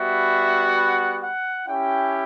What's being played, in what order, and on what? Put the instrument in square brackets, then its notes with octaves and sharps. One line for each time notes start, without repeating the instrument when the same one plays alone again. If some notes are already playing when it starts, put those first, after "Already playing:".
Already playing: [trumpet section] G3 B3 F#4 E5
F#5
F#5
C#4 E4 G4 G5